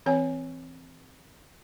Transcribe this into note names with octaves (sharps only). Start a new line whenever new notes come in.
E3 C4 C#5 G#5